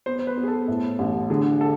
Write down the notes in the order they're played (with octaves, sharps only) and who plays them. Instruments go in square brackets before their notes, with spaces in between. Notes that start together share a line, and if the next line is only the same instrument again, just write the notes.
[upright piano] B3 [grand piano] C5
[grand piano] C5
B4
[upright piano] B3
[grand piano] G#4
A4
[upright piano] A2
A1
[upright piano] D3 [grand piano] G#4
[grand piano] A4